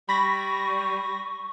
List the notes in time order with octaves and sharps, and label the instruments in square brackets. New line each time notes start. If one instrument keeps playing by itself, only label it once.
[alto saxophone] G3 [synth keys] B5 A#6 [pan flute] C#6